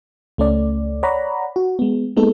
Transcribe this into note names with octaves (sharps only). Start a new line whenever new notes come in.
C#2 A3 C#4 D5
C#5 D5 F#5 A#5 B5
F#4
G#3 B3
G#3 A#3 B3 D#4 A4